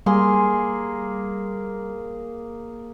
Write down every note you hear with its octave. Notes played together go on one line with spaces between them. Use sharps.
G3 A#3 G#4 C6